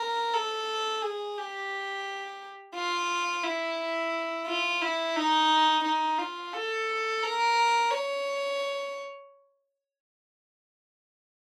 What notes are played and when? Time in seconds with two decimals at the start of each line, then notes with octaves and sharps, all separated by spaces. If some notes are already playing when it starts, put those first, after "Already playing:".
Already playing: A#4
0.34 A4
1.02 G#4
1.37 G4
2.75 F4
3.44 E4
4.46 F4
4.81 E4
5.16 D#4
5.84 D#4
6.19 F4
6.54 A4
7.23 A#4
7.91 C#5